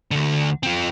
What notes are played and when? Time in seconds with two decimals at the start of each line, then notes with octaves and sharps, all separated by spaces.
0.11 D2 D3
0.63 F3 C4